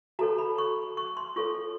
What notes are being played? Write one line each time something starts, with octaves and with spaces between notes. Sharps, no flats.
F#4 A4 C#5 A#5
B5
C#6
C#6
C6
F4 A4 C#5 C#6